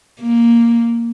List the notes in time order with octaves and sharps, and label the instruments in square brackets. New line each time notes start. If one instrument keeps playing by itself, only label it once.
[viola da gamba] A#3